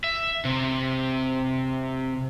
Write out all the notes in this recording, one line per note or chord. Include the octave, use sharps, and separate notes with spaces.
E5
C3